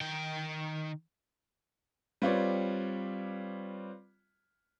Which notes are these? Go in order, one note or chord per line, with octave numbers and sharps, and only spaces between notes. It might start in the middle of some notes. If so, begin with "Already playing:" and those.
D#3 G5
G3 C4 F4 B4 C#5 D5